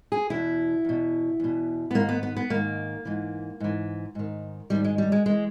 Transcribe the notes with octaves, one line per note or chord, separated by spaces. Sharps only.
G#4
E2 B2 E4
E2 B2
E2 B2
B3
G#2 D#3 A#3
B3
B3
B3
G#2 D#3 A#3
G#2 E3
G#2 E3
G#2 D#3
G#2 D#3 G3
G#3
G3
G#3
E3 G#3